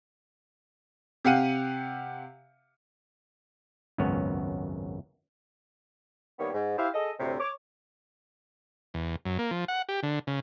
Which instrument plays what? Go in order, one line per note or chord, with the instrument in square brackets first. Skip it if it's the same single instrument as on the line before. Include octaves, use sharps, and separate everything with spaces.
[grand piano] C3 G4 F5 F#5 D#7
[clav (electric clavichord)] G#1 C#2 F#2 B3 C#5
[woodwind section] D#3 G3 A#3 B3 C#5
G#2
E4 G4 C5 E5 F5
G#4 A4 D#5
D2 A2 C3
C#5 D6
[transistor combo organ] E2
F#2
A#3
F3
F#5
G4
D3
C#3